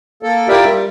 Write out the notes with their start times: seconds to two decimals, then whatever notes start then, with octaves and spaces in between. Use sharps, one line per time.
0.23 A#3 A4
0.48 E4 F4 G4 A#4 D5 E5
0.65 G3